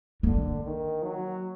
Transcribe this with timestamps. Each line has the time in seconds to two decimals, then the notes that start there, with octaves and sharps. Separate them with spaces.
0.23 D3 A#3
0.64 D#3
1.03 F#3